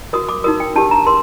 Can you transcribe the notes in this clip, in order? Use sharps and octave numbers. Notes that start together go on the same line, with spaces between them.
F#4 A#4 D#6
D6
D#4 F#4 A#4 D#6
G5
D4 G4 A#4 A5
A#5
A#4 C6